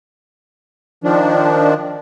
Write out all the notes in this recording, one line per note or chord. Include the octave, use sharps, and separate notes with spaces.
D#3 F3 D4